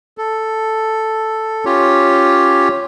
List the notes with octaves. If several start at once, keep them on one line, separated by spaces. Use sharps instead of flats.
A4
C#4 F4 G4 C#5